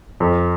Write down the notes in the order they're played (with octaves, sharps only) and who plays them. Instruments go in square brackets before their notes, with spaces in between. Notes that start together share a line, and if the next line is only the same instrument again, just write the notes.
[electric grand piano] F2